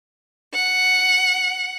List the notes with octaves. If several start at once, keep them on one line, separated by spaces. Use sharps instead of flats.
F#5